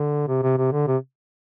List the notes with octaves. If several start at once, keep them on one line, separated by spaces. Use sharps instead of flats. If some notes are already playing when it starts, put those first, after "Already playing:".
Already playing: D3
C3
C3
C3
D3
C3